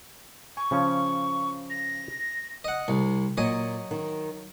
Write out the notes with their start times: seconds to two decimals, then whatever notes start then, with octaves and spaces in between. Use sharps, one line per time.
0.57 G#5 C#6
0.71 C#3 F3 C#4
1.70 A#6
2.64 D#5 F#5
2.88 C2 C3
3.37 A#2 F#3 D#5 G#5
3.91 D#3